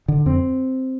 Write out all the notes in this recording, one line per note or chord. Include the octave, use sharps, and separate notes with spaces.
D3
F2 C4